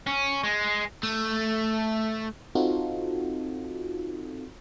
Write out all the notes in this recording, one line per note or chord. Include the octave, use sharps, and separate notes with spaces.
C#4
G#3
A3
C4 D#4 F4 F#4 A4